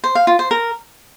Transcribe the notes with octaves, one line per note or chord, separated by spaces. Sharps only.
C5
F5
F4
C5
A#4